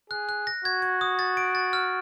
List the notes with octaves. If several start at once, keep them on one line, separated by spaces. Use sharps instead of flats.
G#4 F#6
F#6
A#6
F#4 G#6
G#6
D#6
A6
D7
A6
F6